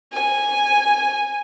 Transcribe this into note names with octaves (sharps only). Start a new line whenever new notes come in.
G#5